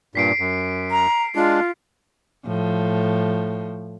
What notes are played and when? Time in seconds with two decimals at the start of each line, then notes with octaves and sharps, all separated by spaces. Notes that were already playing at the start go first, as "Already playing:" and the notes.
0.15 G2 A#2 B6 C7 D7
0.39 F#2
0.91 A#5
1.35 G#3 D4 F4
2.46 A2 F3